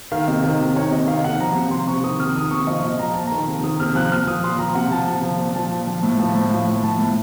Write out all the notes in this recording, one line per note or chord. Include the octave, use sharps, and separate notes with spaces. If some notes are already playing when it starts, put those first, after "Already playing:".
D#3 F5
C3 D#5
D#3
C3
D#3 C#5
C3 D#5
D#3 F5
C3 F#5
F3 A#5
C3
F3 C6
C3 C#6
D#3 D#6
C3 F6
D#3 D#6
C3 C#6
F3 D#5
A#2 D#5
F3 A#5
A#2 A5
D#3 A#5
C3
D#3 D#6
C3 F6
F3 F#6
A#2 F6
F3 D#6
A#2 C6
F3 A#5
C3 F#5
F3 A5
C3
F3
A#2
F3 A5
A#2
F3
A2
F3 A5
A2
F3
A2
F3 A5
A2